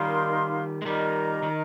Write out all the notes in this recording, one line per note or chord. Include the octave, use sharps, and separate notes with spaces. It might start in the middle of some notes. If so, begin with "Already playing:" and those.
Already playing: D#3 G3 D#4 A#4 F5 C6
G#3
D#3 G3 A#4 D#5 A#5
D#3